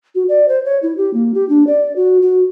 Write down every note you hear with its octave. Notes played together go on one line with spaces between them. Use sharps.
F#4
D5
C5
C#5
E4
G4
A#3
G4
D4
D5
F#4
F#4